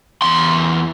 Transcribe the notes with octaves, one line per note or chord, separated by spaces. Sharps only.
E2 C6